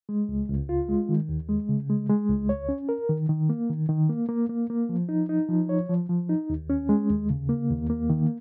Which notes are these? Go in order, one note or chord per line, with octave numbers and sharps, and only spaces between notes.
G#3
C#2
C#2
F4
G#3
D#3
D#2
G#3
C#3
G#3
G#3
C#2
C#5
C#4
A#4
D#3
D#3
A#3
D#3
D#3
A#3
A#3
A#3
A#3
F3
D#4
D#4
F3
C#5
F3
F3
D#4
D#2
C#4
G#3
D#2
C#3
A#3
D#2
A#3
D#3